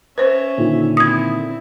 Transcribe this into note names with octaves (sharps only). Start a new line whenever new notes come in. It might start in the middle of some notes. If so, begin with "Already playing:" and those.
C#4 B4 C5 E5
A#2 D3 D#3
C4 E4 D#6 G#6